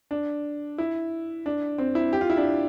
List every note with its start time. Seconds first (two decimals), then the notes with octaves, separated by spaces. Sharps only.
0.11 D4
0.78 E4
1.46 D4
1.78 C4
1.95 E4
2.13 G4
2.21 F4
2.30 E4
2.37 D4